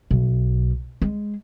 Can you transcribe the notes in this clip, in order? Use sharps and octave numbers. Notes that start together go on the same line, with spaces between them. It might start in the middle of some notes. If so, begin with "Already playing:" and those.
B1
G#3